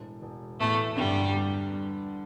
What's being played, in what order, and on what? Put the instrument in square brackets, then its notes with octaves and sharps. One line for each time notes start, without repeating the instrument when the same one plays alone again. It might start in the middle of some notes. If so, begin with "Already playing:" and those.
Already playing: [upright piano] E1 A2
E1
[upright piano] E2 [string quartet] A2 A3
[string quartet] G2 G3 [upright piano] D3
[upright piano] G3
G3